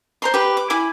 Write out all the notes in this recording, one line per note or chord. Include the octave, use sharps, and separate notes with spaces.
C5 A#5 C6
G4 B4
D6
E4 G#5 B5 D6